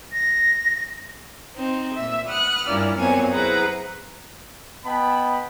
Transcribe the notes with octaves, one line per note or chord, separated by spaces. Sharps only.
A#6
C4 D#4
A#2 E5
B4 F#5 D#6 F6 F#6
G2 A#2 C#4 E4 D5 F6
F#2 A#2 B3 C4 C#5 G#5
E4 G#4 B4 C5 F#5 A#5
B3 D#5 G5 A5 B5